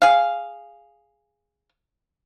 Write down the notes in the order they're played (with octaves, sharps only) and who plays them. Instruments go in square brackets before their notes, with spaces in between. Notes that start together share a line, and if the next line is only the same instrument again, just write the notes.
[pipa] G#4 F5